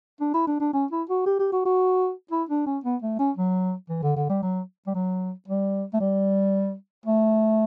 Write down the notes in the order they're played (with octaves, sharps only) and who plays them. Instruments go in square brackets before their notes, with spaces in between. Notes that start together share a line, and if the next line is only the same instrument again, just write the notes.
[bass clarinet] D4
E4
D4
D4
C#4
E4
F#4
G4
G4
F#4
F#4
E4
D4
C#4
B3
A3
C#4
F#3
E3
D3
D3
G3
F#3
G3
F#3
G3
A3
G3
A3